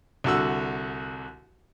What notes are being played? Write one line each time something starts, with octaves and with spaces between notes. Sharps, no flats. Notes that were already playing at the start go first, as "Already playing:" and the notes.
C2 D3 F#4 E6